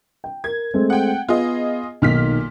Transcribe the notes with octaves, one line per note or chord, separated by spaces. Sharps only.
G5
A#4 G#6
G#3 A3 C4
F#5 G5
B3 F4 G#4 D#5
B1 A#2 D#3 F6 B6